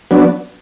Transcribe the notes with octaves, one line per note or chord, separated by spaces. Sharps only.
F#3 B3 D4